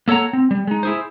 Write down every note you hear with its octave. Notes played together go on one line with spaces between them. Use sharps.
A#3 A4 C#5 F#5 A#5
C4
G3
G#3 D#4
E4 G#4 C5